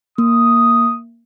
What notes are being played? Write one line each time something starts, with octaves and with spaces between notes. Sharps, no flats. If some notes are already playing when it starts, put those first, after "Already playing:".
A#3 D#6